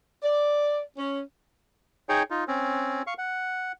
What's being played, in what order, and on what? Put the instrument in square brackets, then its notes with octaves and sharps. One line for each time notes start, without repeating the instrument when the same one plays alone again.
[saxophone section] D5
C#4
[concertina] D#4 G#4 C#5 G5
D#4 F4
C4 C#4
F5 C#6
F#5